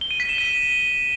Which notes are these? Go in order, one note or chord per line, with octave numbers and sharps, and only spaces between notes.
G7
D#7
B6
E7
D#7